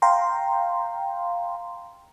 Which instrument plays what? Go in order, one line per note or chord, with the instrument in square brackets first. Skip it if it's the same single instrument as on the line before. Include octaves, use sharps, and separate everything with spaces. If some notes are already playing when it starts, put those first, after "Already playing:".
[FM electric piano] F5 G5 A#5 C6